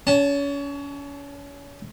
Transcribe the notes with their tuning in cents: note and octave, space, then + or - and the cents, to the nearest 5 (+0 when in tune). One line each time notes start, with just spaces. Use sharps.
C#4 +30 A5 +0